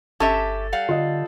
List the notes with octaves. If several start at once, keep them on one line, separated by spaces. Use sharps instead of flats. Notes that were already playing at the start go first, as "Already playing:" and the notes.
G1 C#4 G4 A4 E5
G3 F5 F#5
D3 F4 D#5